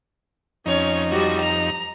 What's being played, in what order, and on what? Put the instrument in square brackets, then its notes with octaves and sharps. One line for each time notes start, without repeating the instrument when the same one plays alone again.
[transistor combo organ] F2 D#4 [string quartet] C#4 C#5
[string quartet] F3 G3 F#4
A#5